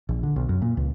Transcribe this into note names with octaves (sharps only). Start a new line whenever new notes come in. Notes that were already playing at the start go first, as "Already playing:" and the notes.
A#1
D3
B1
F#2
A#2
C#2